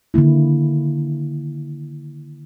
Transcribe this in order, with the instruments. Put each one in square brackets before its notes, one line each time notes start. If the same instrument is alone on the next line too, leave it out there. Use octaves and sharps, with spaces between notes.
[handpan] D3 D#3 A#3 E4